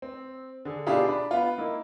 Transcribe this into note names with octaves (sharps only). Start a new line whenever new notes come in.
C4
D3 G#4
B2 D4 E4 F4 G4 G#4
D4 B5
B3 F4
A#3 D#4 E4